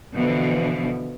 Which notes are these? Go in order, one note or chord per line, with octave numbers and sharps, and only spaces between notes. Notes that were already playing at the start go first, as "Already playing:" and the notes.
B2 D3 E3 F3